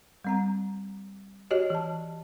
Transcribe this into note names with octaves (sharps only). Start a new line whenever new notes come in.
G3 C4 A#5
F#4 G4 C#5 D#5
E3 A5